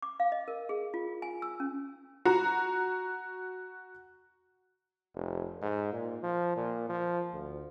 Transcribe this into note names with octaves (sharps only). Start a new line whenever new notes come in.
D6
F5
D#5
A#4
G#4
F4
G#5
E6
C#4
F#4 A#5
F1
G#2
A#2
F3
A#2
F3
D2